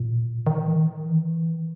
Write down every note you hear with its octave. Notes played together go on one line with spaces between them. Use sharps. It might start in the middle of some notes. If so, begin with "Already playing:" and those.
Already playing: A#2
D#3
E3
D#3
E3